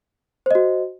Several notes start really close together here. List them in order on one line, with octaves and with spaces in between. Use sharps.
C5 D#5 F#4